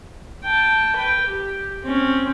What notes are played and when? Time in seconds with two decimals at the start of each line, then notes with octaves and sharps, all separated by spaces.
0.43 G5 A5
0.96 B4 G5
1.26 G4
1.84 C4 C#4